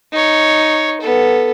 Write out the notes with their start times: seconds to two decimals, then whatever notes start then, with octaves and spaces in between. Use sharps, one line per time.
0.12 D#4 C#5
1.01 B3 A4